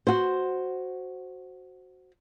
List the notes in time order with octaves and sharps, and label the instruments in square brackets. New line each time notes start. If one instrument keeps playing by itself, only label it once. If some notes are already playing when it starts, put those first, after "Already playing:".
[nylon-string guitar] F#4 C5